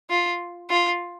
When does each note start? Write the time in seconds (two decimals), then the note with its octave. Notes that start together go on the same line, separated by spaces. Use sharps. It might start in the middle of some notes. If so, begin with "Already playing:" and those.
0.10 F4
0.70 F4